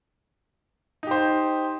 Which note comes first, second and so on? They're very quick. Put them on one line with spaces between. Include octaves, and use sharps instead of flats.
D#4 G4 C5